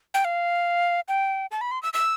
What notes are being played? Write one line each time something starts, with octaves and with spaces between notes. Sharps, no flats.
G5
F5
G5
A5
B5
C6
E6
E6